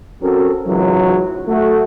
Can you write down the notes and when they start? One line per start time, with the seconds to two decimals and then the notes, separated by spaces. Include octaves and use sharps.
0.22 F#3 C4 C#4 F#4 A4 A#4
0.66 C#2 G#2 E3 F#3
1.48 A3 F#4